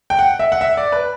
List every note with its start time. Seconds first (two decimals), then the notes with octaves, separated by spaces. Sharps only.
0.10 G5
0.19 F#5
0.39 E5
0.52 F#5
0.61 E5
0.77 D5
0.92 B4